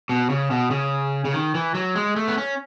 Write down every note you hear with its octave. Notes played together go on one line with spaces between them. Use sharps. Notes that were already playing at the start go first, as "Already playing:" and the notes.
B2
C#3
B2
C#3
C#3
D#3
E3
F#3
G#3
A3
B3
C#4